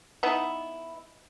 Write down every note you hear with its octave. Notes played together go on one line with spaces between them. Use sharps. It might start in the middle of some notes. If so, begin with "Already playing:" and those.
B3 D#4 E4